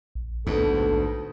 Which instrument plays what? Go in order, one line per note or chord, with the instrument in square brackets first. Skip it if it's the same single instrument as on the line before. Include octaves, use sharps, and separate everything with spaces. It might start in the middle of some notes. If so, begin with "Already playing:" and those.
[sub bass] A#1
[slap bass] D2 G#2 [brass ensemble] B3 A4